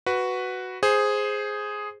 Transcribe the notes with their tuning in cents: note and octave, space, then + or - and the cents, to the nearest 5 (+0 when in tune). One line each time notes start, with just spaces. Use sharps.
F#4 +0 B4 +0
G#4 +0 C5 +0